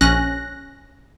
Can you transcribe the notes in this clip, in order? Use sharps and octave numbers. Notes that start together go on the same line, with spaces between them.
A#1 C#4 F#6 A#6